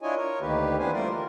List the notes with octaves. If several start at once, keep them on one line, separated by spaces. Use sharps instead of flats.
D4 E4 F4 C#5 D#5 G#5
A#4 C#5
D2 D#3 A#3 G4 B4
E3 B3 D4 B4 C5 G#5
G3 A3 F4 A#4 C5 D5
A#4